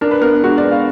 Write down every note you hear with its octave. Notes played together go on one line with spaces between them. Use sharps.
D4 A#4
B4
B3 A#4
G#3 F#4
D5
B3
F5